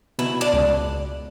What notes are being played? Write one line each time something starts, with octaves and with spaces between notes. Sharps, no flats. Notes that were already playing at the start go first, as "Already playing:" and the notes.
B2 E4
D4
C#2